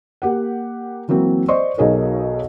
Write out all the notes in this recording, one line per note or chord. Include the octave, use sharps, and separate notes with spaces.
A#3 G4 F#5
E3 F#3 A#3 C4
C5 D5 D#5 C6 C#6
B1 B2 D#4 G#4 A#4 C#5